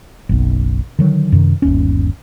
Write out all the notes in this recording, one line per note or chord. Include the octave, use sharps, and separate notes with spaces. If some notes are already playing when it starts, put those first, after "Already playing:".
F#1 B1
D3 D#3 F#3
F#2 C3 D#3
G1 D#2 C#4